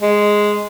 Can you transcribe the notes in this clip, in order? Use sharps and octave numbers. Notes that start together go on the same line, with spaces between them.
G#3